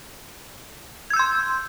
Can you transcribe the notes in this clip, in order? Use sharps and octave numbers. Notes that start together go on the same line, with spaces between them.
C6 E6 G6 G#6